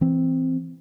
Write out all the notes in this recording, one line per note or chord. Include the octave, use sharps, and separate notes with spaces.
E3 C4